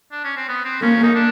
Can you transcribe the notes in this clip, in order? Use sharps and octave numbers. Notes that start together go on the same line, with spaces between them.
D4
C#4
C4
B3
C4
A#3 C#4
D#4
D4